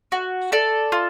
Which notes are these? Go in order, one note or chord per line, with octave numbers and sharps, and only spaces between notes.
F#4
A4 D5
F4